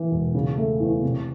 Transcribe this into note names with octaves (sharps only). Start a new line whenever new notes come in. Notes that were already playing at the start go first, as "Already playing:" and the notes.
Already playing: E3
E1
C#3
A3
E2
C3